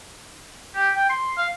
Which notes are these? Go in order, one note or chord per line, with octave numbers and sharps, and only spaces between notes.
G4
G5
C6
F5